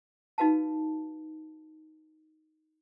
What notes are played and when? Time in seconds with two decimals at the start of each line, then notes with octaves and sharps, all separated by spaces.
0.38 D#4 F#4 B4 F5 A5